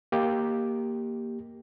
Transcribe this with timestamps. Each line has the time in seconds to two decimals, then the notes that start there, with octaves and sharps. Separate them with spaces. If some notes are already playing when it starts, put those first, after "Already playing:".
0.12 A#3 G4